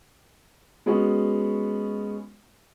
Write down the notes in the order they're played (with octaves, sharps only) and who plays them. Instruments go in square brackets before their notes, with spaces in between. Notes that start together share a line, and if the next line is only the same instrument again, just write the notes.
[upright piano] G#3 B3 C#4 F#4